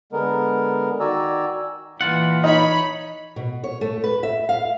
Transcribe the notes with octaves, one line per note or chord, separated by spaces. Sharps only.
D3 G#3 B3 A#4
D#3 F#4 D5 G#5 A#5 E6
A#2 E3 F4 F#5
D#4 C#5 B5
B2
C#5
A3
B4
E5
F5